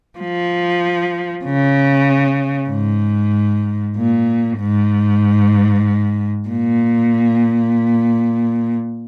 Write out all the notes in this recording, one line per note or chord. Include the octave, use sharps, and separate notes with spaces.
F3
C#3
G#2
A#2
G#2
A#2